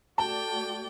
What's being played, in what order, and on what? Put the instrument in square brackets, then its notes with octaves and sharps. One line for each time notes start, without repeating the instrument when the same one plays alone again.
[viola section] A3 F#4 D5 [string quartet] G5 [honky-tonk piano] A5